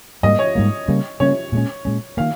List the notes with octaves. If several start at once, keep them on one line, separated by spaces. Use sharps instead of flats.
G#2 G3 A#3 D#5
C#5
G#2 G3 A#3
C#3 G3 A#3 C#4
C#3 G3 A#3 C#4 C#5
A#2 G#3 C#4
A#2 G#3 C#4
D#3 A#3 F5